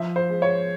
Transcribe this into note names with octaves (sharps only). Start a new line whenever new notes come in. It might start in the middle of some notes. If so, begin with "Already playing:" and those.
Already playing: F3 E5
C5
G#3
C#5